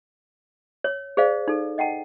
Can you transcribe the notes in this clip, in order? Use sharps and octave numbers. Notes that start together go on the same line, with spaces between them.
C#5
G#4 C5 D5 F5
D#4 A4
D#5 F#5 G5 A5